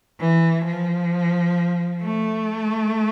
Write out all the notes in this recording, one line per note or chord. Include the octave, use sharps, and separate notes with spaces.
E3
F3
A3